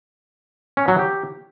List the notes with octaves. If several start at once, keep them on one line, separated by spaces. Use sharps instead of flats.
C#4
F#3
G4